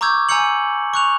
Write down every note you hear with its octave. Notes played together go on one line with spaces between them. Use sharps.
A#5 C#6 D6 E6 G6 G#6
G#5 A#5 E6 G6 C#7 F#7
C#6 F#6 F7